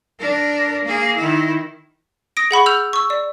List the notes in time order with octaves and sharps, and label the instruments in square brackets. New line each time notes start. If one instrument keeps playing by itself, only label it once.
[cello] D4 A#4
A#3 G#4
D#3 E4
[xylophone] D#6 A#6 D7
G#4 F#5 B5 C#6
E6 F6 G6 F7
C#6 E6
D5